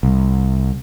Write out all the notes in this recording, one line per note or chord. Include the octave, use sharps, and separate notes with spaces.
C2